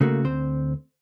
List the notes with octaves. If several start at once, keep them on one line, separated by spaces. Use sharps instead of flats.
C#3 A3 A#3 F#4
D2 C4 C5